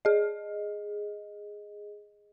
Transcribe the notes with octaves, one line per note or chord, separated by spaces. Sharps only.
G#4 D#5